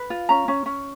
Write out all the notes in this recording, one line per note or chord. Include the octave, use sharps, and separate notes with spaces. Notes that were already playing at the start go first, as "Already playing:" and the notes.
Already playing: B4
F4
C#4 A#5
C#4
C#4